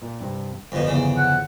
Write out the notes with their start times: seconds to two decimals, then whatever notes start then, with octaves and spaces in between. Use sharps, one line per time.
0.02 A#2
0.21 G2 C3
0.72 G1 F2 B2 D3 F3
0.86 E2 C#3
1.17 F#5